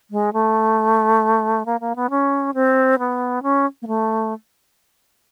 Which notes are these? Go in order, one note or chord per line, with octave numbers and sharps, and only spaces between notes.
G#3
A3
A#3
A#3
B3
C#4
C4
B3
C#4
A#3
A3